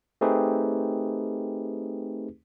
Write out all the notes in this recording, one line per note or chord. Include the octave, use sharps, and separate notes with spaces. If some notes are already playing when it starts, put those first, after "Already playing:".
A3 C4 D#4 G4 G#4 B4